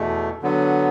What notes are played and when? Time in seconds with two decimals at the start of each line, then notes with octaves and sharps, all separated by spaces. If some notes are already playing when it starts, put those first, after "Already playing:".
Already playing: E2 B2 A3
0.42 D3 F#3 B3